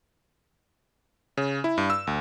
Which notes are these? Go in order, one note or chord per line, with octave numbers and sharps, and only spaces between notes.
C#3
E4
G2
E6
D2